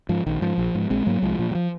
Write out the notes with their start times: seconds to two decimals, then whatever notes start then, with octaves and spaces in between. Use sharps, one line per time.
0.09 G#2 F3
0.26 A#1 D#3
0.41 G#2 F3
0.58 A#1
0.75 G#2
0.90 A#1 G#3 C4
1.06 G#2 F#3 A#3
1.22 C2 F3 G#3
1.39 A#2 F3
1.51 F#3
1.55 F3